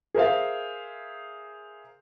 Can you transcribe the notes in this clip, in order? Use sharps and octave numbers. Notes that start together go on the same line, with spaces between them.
G#4 A#4 C5 E5 F5